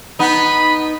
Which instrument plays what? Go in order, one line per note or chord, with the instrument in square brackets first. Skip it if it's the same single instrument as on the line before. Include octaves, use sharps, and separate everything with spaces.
[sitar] B3 D#4 [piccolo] B5